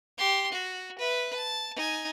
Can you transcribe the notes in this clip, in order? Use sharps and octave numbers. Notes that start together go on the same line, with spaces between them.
G4 C6
F#4
B4 E5
A5
D#4 G#5